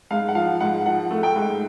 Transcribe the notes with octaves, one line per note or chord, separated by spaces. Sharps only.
G#2 F5
F#5
F3 F5
G#2 F#5
F3 F#5
A3
G5
G#2